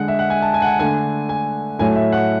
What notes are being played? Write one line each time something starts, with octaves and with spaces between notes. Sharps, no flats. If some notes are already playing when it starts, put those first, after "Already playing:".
Already playing: D3 G#3 F#5
E5
F#5
G#5
A5
G#5
F#5
G#5
D3 A3 G#5
G#5
A2 F#3 A3 G#5
E5
F#5